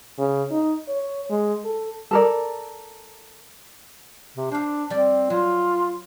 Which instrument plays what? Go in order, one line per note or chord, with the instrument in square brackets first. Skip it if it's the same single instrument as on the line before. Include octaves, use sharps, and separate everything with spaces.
[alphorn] C#3
D#4
C#5
G#3
A4
[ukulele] A4 A#4 D5
[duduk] C3
[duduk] D4 [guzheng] C5 F5
[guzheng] G3 D5 [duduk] C4
[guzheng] F#3 [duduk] F4